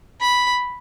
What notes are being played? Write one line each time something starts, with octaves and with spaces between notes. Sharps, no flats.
B5